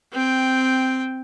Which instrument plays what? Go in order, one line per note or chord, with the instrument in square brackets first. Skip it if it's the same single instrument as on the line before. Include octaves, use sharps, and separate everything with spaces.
[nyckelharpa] C4 G5